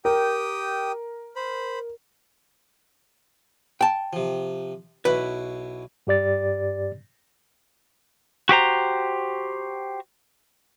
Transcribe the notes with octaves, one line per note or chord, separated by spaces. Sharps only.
G4 A#4 G5 D#6
C5 B5
G5 A5
C3 F3
B1 B2 E4 B4
G2 G4 D5 A6
F#4 G4 C5 A#5